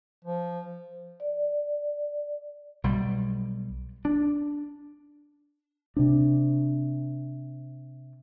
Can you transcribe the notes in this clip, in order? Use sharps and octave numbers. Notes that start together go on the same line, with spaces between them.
F3
D5
B1 G3
D4
C3 C4 D4